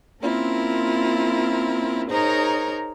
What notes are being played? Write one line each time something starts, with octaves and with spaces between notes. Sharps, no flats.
A#3 C4 C#4 E4 F4 A#4
D#4 G#4 A#4 C5 C#5 A#5